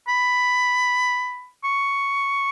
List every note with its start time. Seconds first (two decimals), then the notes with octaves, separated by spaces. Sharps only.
0.08 B5
1.64 C#6